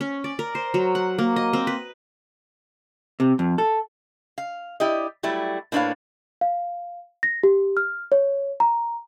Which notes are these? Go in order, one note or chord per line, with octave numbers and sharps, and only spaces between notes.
C#4
D5
A#4
C5
F#3
F#5
A#3
D#5
C4
B4
C3
F2
A4
F5
E4 G4 D5 D#5
F#3 G3 A3 E4
A2 A#3 D4 B4 C#5 F5
F5
A#6
G4
F6
C#5
A#5